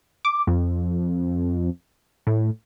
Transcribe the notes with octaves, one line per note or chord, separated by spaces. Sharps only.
D6
F2
A2